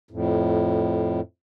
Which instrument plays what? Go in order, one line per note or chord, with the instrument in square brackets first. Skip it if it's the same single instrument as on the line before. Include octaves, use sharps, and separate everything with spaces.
[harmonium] F2 A2